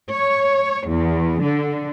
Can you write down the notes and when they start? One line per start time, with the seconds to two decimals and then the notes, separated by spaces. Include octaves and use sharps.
0.12 C#5
0.88 E2
1.44 D3